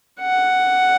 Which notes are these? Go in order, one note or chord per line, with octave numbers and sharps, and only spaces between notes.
F#5